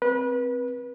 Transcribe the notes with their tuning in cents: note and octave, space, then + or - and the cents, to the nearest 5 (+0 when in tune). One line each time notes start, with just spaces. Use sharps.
C4 +0 B4 -25